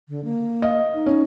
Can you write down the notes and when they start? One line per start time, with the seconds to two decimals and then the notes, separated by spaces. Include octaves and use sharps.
0.09 D3
0.25 A#3
0.62 D#5 F5
0.94 D#4
1.06 C#4